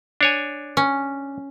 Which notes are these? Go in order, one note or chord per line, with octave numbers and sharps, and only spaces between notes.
D4 C#5 G#5
C#4